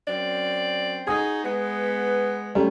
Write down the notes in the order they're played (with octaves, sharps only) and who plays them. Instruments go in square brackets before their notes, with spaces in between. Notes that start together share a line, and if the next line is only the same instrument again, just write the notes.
[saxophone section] F#2 C4 D5
[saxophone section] D#4 F#4 G#4 [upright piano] D#6
[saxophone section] G#3 B3
[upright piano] F#2 G3 A3